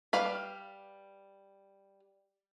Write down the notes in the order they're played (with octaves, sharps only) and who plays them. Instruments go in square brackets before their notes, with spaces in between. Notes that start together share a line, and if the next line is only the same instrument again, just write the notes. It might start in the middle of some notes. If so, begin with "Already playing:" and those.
[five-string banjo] G3 B4 F5 B5